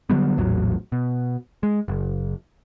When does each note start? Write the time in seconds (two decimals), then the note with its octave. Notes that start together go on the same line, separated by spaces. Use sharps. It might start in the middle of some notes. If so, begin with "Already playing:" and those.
0.10 D3 F#3 G3 B3
0.38 A#1 E2 A2 F#3
0.92 B2
1.63 G#3
1.88 F#1